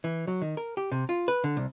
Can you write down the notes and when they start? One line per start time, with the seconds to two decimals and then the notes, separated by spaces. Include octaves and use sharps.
0.04 E3
0.27 F#3
0.42 D#3
0.57 A#4
0.77 G4
0.92 C3
1.09 F4
1.28 B4
1.44 D3
1.57 C2